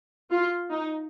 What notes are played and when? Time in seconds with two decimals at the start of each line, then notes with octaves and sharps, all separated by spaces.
0.31 F4
0.70 D#4